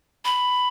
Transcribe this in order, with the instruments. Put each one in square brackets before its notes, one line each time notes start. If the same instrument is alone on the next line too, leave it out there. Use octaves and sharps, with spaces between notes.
[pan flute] B5